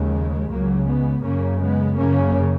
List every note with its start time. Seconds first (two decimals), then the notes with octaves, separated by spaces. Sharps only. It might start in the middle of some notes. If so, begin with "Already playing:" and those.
Already playing: D#2 C#3 F3 G#3
0.51 C#2 C#3 F#3 A#3
0.87 G#3 B3
1.24 F#2 C#3 A#3 C#4
1.60 G#3 B3
1.96 F#2 C#3 A#3 C#4